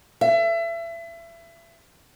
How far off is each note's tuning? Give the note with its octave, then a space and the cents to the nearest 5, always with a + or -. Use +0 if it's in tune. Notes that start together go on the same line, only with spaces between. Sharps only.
E5 +30